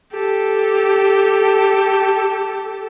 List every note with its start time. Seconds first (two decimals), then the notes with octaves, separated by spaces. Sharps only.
0.13 G4 A4